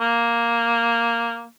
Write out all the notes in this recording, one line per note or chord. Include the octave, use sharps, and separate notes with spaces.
A#3